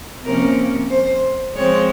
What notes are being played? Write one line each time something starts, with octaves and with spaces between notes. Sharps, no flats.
C3 F3 A#3 C#4 A#4
C5
F3 G#3 C4 C#5